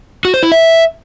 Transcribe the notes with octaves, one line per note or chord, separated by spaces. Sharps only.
F#4
C5
E4
E5